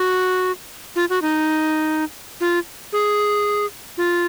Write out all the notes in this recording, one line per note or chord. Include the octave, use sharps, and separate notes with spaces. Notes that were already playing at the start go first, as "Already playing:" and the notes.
Already playing: F#4
F4
F#4
D#4
F4
G#4
F4